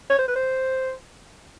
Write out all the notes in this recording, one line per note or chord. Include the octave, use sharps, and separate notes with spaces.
C#5
C5
B4
C5